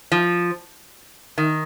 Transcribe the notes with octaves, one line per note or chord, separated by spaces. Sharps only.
F3
D#3